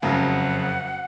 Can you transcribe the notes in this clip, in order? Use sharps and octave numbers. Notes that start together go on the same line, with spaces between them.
F#1 F2 C#3 F#3 F#5